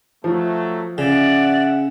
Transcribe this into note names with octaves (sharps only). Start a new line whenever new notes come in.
F3 F#3 A3
C#3 D5 E5 F#5